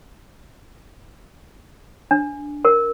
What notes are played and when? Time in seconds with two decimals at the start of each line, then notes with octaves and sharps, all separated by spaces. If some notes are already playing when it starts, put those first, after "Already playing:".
2.11 D4
2.65 A#4